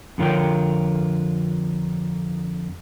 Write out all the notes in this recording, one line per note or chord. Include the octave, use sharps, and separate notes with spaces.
F2 D3 F4 A#4 C#5 G5